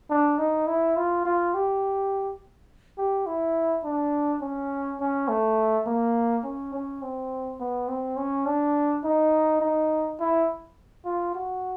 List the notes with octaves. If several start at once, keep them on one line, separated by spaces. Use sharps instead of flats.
D4
D#4
E4
F4
F4
G4
G4
E4
D4
C#4
C#4
A3
A#3
C#4
C#4
C4
B3
C4
C#4
D4
D#4
D#4
E4
F4
F#4